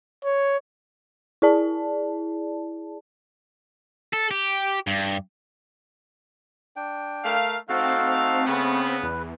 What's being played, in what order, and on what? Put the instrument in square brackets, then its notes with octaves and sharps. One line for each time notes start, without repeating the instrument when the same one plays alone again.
[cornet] C#5
[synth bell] E4 G#4 D5 A5
[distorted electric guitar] A4
G4
G2
[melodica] D4 G5
[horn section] A3 A#4 F5
[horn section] A3 D#4 F5 [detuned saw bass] C4 [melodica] F#4 A4
[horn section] C#3 B3 [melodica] A3 F#5
[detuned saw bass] E2 [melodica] B4